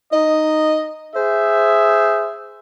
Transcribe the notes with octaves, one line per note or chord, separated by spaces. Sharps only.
D#4 D#5
G#4 C5 E5